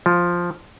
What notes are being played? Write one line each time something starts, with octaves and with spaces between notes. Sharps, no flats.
F3